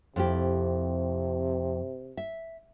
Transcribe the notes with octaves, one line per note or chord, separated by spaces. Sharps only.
F2 C3 E4 G4
E5